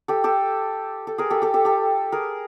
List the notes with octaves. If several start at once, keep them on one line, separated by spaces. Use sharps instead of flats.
G4 A4
G4 A4
A4
G#4 A#4
G4 A4
G4 A4
G4 A4
G4 A4
G#4 A#4